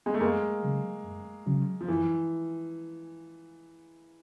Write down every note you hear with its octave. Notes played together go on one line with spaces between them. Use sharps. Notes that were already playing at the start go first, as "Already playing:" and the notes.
G#3
A3
F#2 G#3 A#3
C#3 F#3
F#2
C#3 F#3
F3
F#2 E3